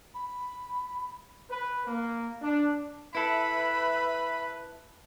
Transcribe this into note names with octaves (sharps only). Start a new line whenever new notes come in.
B5
B4
A#3
D4
E4 A4 B4 E5 B5